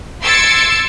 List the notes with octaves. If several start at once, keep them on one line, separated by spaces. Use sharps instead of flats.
C6 E6 G#6 A6 C#7 D7